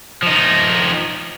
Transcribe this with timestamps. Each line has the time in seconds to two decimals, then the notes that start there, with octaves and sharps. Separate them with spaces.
0.23 F3 D#4